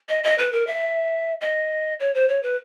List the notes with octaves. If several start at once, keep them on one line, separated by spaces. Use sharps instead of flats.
D#5
D#5
B4
A#4
E5
D#5
C#5
C5
C#5
B4